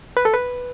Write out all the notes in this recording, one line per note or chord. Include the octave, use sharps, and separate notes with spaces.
B4
A4
B4